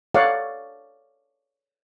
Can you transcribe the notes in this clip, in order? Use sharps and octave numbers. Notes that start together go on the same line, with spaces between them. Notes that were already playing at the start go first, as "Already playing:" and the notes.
A4 C#5 D5 F5 F#5